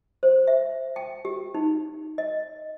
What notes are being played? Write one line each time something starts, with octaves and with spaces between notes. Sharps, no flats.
C5
E5
G5
G4
D#4
D#5